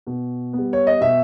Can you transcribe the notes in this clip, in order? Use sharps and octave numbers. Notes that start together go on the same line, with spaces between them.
B2
G3 B3
C#5
D#5
B2 E5